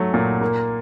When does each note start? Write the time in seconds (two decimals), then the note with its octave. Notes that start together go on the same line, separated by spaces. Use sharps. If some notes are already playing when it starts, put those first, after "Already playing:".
Already playing: F#3 A3
0.14 A#2
0.41 A#3